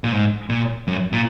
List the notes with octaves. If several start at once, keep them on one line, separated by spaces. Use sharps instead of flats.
A#2
G#2
A#2
F#2
A#2